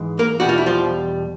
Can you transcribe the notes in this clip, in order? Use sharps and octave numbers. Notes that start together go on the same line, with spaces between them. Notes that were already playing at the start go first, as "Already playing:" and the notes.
Already playing: G#2 E3 G#3
A#3 A#4
E2 B2 G3 F#4
F4
E4
F3 F4